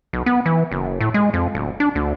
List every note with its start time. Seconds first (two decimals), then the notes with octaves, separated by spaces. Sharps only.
0.13 B1
0.26 B3
0.46 E3
0.72 F#1
1.00 A2
1.14 G#3
1.34 F2
1.55 D1
1.80 D4
1.95 D2